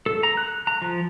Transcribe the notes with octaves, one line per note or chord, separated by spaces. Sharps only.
A4
A#5
F#6
A#5
F3